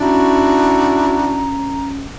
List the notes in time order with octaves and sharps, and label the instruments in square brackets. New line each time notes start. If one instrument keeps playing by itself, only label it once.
[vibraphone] C#4 [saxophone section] D4 E4 F#4 [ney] A#5